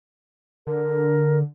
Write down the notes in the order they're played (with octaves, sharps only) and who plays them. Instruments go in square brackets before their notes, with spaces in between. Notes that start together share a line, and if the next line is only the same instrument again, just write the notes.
[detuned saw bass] D3 [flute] A#4